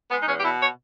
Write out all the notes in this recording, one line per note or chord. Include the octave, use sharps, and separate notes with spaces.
G#3 B3
D#4
E2 C#4
G4
B2 E4
C#5